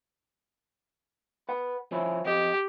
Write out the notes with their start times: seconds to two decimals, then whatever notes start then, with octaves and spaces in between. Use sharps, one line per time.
1.49 B4 F#5
1.92 F3 C#4 E4
2.26 F2 G4 D#5